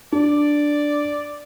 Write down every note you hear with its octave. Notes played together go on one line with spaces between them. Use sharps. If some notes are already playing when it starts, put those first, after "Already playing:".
D4 D5